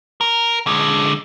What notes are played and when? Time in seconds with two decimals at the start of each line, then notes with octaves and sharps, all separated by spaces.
0.21 A#4
0.67 D3 G#3